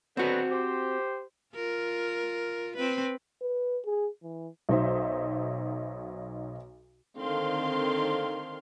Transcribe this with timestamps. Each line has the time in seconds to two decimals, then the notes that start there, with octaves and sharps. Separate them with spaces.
0.17 D3 F#3 B3 C4 F#4
0.52 G4 C5
1.54 F4 A#4
2.76 C4 B4
3.42 B4
3.85 G#4
4.23 E3
4.69 B1 F#3 D#4 C5 E5
7.19 D3 D#3 C4 F5 C6